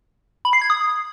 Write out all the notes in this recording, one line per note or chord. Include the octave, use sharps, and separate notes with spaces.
B5
C7
G#6
D#6